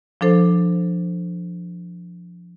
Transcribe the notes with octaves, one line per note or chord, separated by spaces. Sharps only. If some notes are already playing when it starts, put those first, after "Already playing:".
F3 D4 A4 C5